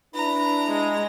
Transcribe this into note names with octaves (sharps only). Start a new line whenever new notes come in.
D4 E4 B4 A#5
G#3